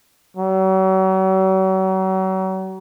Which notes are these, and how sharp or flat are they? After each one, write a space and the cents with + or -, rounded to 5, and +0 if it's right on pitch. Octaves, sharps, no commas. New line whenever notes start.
F#3 +40